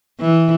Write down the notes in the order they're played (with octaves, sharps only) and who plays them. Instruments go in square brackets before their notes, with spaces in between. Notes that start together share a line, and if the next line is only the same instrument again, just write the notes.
[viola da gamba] E3